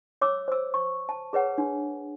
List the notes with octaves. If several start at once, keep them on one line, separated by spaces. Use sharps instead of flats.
C#5 D6 E6
C5 E6
C#6
A5
G#4 B4 C#5 F#5
D4